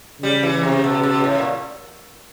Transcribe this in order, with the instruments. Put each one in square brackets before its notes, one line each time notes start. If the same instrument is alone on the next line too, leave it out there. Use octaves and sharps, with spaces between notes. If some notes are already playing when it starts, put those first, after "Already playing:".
[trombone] C#3 [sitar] G3
[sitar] E3
C3
B2
B2
A2
A#2